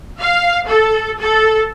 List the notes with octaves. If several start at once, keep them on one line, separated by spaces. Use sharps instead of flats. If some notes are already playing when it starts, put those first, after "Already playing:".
F5
A4
A4